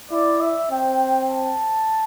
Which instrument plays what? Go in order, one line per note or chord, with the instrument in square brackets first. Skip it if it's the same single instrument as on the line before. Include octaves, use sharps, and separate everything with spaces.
[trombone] E4 [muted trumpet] D5
[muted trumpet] E5
[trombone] C4 [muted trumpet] G5
[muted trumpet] A5